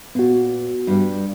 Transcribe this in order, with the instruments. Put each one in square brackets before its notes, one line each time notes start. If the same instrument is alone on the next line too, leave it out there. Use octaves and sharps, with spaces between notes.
[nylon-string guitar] A#2 [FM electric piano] B3 F#4
[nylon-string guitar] G2 G3